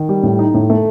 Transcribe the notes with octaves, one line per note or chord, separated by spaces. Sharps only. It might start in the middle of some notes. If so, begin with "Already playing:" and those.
Already playing: D#3
G3
A2
D#4
A2
A3